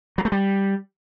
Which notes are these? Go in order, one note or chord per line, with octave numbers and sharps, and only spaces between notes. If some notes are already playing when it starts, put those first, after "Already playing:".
F#3
A3
G3